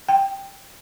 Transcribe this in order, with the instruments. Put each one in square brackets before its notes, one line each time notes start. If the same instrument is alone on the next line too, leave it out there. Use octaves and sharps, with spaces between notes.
[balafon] G5